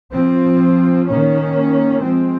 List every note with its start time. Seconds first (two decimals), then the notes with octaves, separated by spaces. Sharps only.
0.12 F3 C4
1.07 D#3 A#3 C#4
2.02 F3 G#3 C4